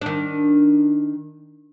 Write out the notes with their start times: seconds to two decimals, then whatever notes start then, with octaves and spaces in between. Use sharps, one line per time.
0.01 D#3 D4